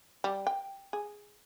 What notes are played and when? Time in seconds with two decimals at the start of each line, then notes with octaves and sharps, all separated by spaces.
0.24 G3
0.47 G5
0.93 G#4